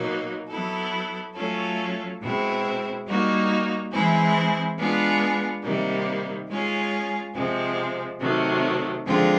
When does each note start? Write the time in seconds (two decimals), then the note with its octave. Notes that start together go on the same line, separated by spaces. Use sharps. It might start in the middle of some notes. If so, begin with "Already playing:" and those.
Already playing: B2 F#3 A#3 D#4
0.49 F#3 B3 E4 A4
1.35 F#3 A3 C#4 F4 A4
2.20 B2 G#3 C4 E4
3.06 G3 A#3 D#4 F#4
3.91 E3 G#3 C4 E4 G#4
4.77 G#3 B3 D4 F4 G#4
5.62 C3 D#3 G3 A#3 D#4
6.48 G#3 C#4 F4 G#4
7.34 C3 F3 G#3 C4
8.19 C3 D#3 F#3 A3
9.05 D3 F3 G#3 C4 F4